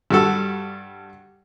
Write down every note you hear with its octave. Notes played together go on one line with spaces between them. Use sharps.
G2 G3 F#4 A4